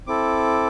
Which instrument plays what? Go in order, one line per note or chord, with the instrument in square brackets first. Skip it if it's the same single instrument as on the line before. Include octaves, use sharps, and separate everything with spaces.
[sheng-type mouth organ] C4 E4 A4 D6